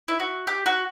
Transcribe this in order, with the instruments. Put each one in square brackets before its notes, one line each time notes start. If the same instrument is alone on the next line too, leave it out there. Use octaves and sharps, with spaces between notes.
[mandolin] E4
F#4
G4
F#4